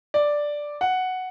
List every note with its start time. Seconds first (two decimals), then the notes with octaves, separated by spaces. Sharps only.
0.14 D5
0.81 F#5